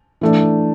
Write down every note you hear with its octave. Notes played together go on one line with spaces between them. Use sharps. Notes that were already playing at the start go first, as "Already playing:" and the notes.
E3 A3 D4